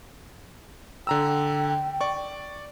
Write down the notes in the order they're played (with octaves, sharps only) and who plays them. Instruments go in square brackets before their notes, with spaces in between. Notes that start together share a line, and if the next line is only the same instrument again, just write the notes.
[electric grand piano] D3 A#5 E6 [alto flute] G5
[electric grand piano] D5 C#6